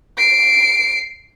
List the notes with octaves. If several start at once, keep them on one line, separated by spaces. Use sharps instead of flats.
C7 D7